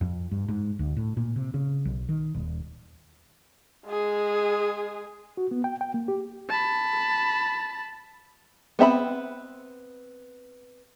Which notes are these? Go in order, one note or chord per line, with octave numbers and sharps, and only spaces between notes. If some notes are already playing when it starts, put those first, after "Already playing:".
F2
G2
G#2
D2
A2
A#2
C3
C#3
B1
D#3
D#1
G#3 G#4
F#4
B3
G5
G5
A#3
G4
A5 B5
B3 C4 E5 A#5 B5